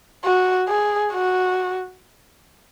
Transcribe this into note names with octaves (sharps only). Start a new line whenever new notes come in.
F#4
G#4
F#4